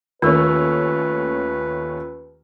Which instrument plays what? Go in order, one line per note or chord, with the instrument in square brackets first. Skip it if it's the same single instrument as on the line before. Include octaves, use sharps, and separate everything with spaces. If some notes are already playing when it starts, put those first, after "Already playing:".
[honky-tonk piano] D#2 A3 C#4 [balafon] D#3 [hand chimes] F4 E6 [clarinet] B4